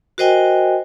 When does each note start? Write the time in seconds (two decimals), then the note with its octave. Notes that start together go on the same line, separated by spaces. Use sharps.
0.18 F#4 A#4 C5 D#5 G5 G#5